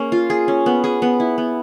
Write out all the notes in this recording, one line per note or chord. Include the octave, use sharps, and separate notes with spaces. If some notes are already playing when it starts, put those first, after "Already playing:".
Already playing: A#3 C#4 G#4
F4
G#4
C#4
B3
G#4
B3
E4
B3